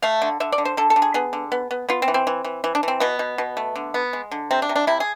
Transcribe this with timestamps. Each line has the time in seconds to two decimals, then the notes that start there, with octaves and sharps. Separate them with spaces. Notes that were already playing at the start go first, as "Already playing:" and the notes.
0.02 A3 F5
0.22 D3
0.40 D3 E5
0.52 D5
0.58 D3
0.65 C5
0.77 D3 A4
0.90 A4
0.96 D3
1.02 G#4
1.14 B3 G#4
1.33 D3
1.52 B3
1.71 B3
1.89 B3 F4
2.02 C4
2.08 E3
2.14 C4
2.27 E3
2.44 E3
2.64 E3
2.75 D4
2.83 E3 C4
3.00 B2 B3
3.19 B2
3.38 B2
3.57 A3
3.75 D3
3.94 B3
4.13 G#3
4.31 D3
4.51 C3 C4
4.62 D4
4.69 C3
4.76 D4
4.87 C3 E4
5.00 G#4